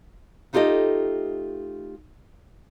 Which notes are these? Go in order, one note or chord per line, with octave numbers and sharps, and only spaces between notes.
A3 D#4 F4 G4 A4 D#5